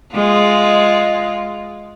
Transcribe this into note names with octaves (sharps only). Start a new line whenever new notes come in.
G#3 F4